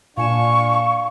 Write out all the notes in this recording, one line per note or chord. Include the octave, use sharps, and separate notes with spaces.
A#2 D4 F5 G#5 C#6 E7